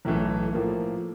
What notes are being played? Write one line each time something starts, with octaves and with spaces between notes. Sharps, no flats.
B1 A2 E3 A3
A2 F3 A#3